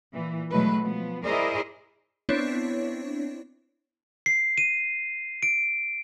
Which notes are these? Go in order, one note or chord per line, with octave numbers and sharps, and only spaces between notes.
A#2 E3
B2 F#3 G#3 A3 B4
F3 B3
E4 G#4 A#4 C5 D5 D#5
B3 C4 D4 E4 C#5
C7
D#7
D7